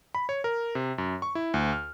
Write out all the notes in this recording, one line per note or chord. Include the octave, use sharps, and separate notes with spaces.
B5
C#5
A#4
C3
F#2
C#6
E4
D2
F6